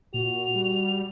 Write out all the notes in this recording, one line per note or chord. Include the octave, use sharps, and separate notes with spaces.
A#2 F#4 F7
G3